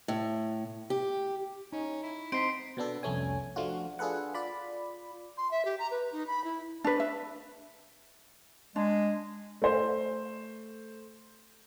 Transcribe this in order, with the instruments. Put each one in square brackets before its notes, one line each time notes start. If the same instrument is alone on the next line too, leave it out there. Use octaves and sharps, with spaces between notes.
[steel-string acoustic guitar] A2
G4
[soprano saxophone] C#4 [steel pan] D#4
[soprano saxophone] E4
[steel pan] C4 [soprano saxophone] D#4 [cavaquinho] C5 [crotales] B6 C7 D7
[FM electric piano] B2 B3 D4 A4
C2 F2 A3 C#4 G#5
F3 A3 D4 F4 F#4
D4 F4 G#4 A4 B4 F#5
F4 D5 B5
[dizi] C6
E5
G4
A#5
B4
D#4
B5
E4
[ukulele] D4 B4
E5
[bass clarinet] G#3 [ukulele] D4
[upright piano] A3 C5